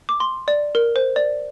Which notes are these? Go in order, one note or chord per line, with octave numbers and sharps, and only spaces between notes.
D6
C6
D5
A#4
C5
D5